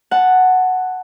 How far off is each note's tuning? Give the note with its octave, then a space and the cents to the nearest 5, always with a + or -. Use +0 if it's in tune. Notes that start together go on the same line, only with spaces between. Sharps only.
F#5 +0 A5 +0